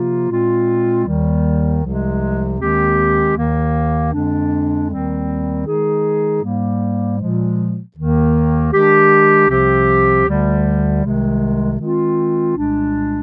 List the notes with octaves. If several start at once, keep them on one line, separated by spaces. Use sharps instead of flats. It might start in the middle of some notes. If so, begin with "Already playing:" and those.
Already playing: C3 F3 A#3 F4
A#2 G#3 C4 F4
D#2 D#3 G3
C2 C3 F3 G#3
D#2 D#3 G#3 C4 G4
D#2 D#3 A#3
F2 D3 G#3 D4
D#2 D#3 G3 C4
D#3 G#3 D#4 G#4
G#2 G3 A#3
A#2 F3 G#3
D#2 D#3 A#3
D#3 G#3 D4 G4
C2 C3 F3 C4 G4
D2 D3 G3
C2 C3 D#3 G#3
D#3 G#3 C4 F4
C2 A#2 G#3 D4